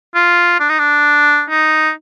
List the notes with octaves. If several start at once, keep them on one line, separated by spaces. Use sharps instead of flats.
F4
D4
D#4
D4
D#4